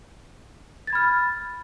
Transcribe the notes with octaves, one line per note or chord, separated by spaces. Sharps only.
B5 F6 G#6 A6